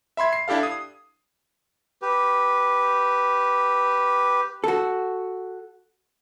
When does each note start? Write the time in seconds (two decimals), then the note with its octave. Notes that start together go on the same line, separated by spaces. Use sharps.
0.17 E5 B5 C6 G#6
0.33 C7
0.48 D4 E4 G4 A4 F5
0.63 D#6
2.02 G4 B4
4.64 F#4 A4